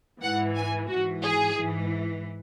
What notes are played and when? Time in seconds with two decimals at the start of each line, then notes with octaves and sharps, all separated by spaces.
0.21 G#2 E3 F#5
0.55 G#5
0.88 G#2 E3 F#4
1.22 G#4
1.56 G#2 E3